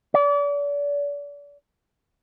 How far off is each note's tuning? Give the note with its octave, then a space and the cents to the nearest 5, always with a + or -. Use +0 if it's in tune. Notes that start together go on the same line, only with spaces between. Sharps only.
D5 -35